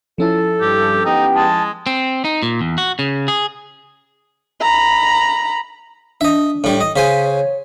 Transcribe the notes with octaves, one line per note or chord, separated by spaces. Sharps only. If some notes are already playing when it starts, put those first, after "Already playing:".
F3 C#4 E4 A4
G2 G4
B3 D#4 G4 G5
G#3 A5
C4
D#4
A#2
E2
F#4
C#3
G#4
A#5 B5
D4 D#5 E5
A2 G3
D#5
C#3 C5 G#5 B6
C#5